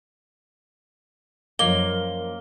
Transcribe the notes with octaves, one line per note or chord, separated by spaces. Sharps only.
F#2 F3 A#3 D#5 G7